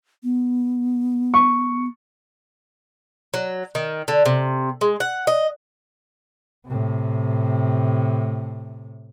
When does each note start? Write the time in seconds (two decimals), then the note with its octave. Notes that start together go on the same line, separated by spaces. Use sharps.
0.23 B3
1.34 C#6
3.34 F#3
3.75 D#3
4.08 D3
4.25 C3
4.81 G#3
5.00 F#5
5.27 D#5
6.66 A2 C3